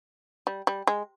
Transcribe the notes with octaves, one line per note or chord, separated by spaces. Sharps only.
G3
G3
G#3